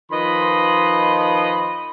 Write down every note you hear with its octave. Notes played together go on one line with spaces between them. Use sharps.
D#3 F3 B4 D#5 B5 C6